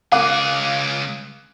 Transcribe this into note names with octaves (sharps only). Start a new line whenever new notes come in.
C#2 G#4 F5 D6 F#6